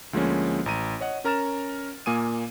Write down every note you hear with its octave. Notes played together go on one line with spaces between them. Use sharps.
D2 F3 G#3 A#3 C#4
A1 A#5 D#7
C#5 D#5 F#5
C#4 A#4 A#5 F6 A6 E7
A#2 A#3 G#5 D#6 D#7